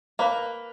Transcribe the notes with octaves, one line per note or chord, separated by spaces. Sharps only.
A#3 B4